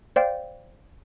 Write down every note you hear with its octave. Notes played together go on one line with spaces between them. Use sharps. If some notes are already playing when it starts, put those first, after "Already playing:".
C5 D5 F5 G5